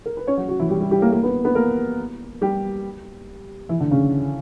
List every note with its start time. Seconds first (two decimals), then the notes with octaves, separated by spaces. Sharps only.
0.06 A#4
0.17 B4
0.27 C#4 C#5
0.37 F#3 F#4
0.48 F#3 F#4
0.59 E3 E4
0.69 G3 G4
0.80 G3 G4
0.91 G3 G4
1.02 A#3 A#4
1.12 A#3 A#4
1.23 B3 B4
1.44 B3 B4
1.55 A#3 A#4
2.41 G3 G4
3.69 E3 E4
3.80 D3 D4
3.91 C#3 C#4